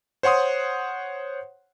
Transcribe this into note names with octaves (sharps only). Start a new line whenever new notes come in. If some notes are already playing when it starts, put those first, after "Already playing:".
C5 C#5 F#5 C6 D#6